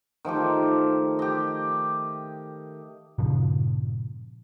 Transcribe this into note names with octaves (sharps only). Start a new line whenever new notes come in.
D#3 F3 A3 G4
G4 D#5
G2 A#2 C#3 F3